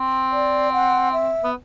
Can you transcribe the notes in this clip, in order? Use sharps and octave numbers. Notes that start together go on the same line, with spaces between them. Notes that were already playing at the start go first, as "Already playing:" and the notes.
Already playing: C4
D5
F#5
E5
B3